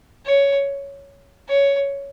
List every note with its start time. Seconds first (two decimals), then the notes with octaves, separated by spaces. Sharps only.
0.25 C#5
1.48 C#5